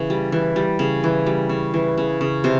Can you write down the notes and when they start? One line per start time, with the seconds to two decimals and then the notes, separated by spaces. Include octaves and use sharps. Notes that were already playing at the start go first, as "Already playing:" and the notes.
Already playing: C#3 E3
0.10 G3
0.32 E3
0.56 G3
0.79 C#3
1.04 E3
1.26 G3
1.49 C#3
1.74 E3
1.98 C#3
2.21 C#3
2.44 C3 C5